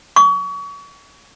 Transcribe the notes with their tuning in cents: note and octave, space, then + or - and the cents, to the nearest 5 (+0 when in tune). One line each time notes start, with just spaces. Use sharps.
C#6 +35